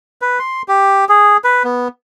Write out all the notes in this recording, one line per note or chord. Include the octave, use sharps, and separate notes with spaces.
B4
C6
G4
G#4
B4
B3